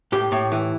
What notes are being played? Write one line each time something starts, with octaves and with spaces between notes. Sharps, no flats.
A2 G4
A2
E3